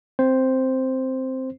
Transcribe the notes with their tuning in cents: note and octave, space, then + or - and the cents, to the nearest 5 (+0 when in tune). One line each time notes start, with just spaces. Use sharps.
C4 +0 C5 +0